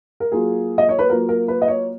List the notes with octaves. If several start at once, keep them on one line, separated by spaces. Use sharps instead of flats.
A#4
F#3 A#3 F4 G#4
D#5
C#5
B4
F#3 A#3 F4 A#4
A#4
B4
D#5
C#5